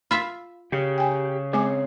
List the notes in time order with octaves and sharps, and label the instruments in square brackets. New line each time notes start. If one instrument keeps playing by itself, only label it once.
[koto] F4 E5 F5 [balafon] B5
[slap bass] C#3 [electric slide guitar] G4
[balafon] G5 G#5
[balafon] G#3 G#5 D6 [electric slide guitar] C4 G#4 C#5